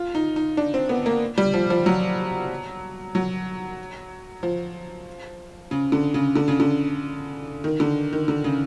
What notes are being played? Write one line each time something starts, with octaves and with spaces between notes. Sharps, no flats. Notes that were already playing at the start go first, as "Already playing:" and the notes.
Already playing: F4
D#4
D#4
D4
C4
B3
A#3
G3
F3
F3
F#3
F#3
F3
C#3
D3
C#3
D3
C#3
D3
D#3
D3
D#3
D3
C#3